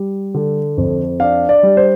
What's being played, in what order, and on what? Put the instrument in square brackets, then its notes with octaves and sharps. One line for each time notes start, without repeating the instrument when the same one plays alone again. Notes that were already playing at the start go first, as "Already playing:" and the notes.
Already playing: [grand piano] G3
D3
F2
D4 F5
D5
G3
C5